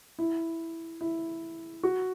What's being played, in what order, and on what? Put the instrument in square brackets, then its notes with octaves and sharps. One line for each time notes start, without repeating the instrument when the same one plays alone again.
[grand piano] E4
E4
F#4